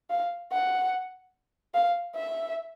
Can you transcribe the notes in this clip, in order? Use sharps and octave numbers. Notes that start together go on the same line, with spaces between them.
F5
F#5
F5
E5